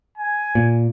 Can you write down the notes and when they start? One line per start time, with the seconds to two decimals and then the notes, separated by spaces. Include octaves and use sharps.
0.18 G#5
0.55 A#2